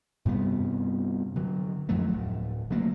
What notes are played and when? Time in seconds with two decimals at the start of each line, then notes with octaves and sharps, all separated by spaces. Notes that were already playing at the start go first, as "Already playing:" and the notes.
0.25 G2 C3 G3 B3
1.36 D3 F#3
1.89 F2 F3 F#3 A3
2.13 D1
2.70 D3 F#3 A3 A#3